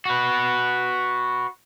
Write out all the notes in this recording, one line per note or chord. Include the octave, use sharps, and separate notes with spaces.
F#4 B4